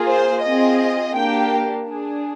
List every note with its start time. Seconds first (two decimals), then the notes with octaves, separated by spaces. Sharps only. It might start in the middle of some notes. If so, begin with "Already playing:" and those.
Already playing: A#3 F4 G#4
0.09 C5
0.44 C4 F4 G#4 D#5
1.15 A#3 D4 G4 G5
1.86 D4 G#4